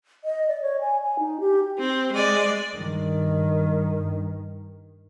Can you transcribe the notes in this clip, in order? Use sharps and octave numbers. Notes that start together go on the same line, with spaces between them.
D#5
D5
C#5
G#5
G#5
D#4
G4
C4
G#3 D5
G2 D#3